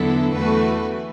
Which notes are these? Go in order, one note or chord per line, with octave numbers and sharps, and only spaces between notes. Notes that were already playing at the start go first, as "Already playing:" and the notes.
Already playing: E2 D3 F#3 B3 E4 A4
E2 E3 A3 F#4 B4